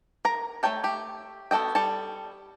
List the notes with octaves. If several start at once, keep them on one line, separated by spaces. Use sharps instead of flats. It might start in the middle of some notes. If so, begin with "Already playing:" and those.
A#4 A#5
A3 A#4 C#5 G5 A5
A3 G4
B3 F#4 A4 D#5 G5
G3 A4 A5